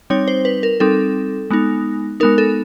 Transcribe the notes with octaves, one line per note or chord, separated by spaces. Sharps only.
G3 C4 D#4 C#5
C5
B4
A#4
G3 C4 D#4 A4
G#3 B3 D#4
G#3 B3 D#4 A#4
A4